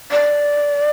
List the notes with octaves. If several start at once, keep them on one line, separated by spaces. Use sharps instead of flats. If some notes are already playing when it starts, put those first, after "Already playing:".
D5